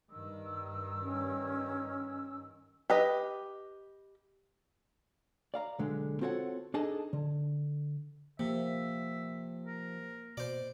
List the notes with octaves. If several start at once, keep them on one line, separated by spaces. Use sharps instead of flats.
G2 D#3 E6
C#4
G4 B4 D#5
D5 F5 A#5
B1 D3 G#3
C4 F4 F#4 A4 C#5 F#5
D4 D#4 G#4 A4 D#5 A5
D3
C3 F3 A#3 E5
A#4
B2 C5 D5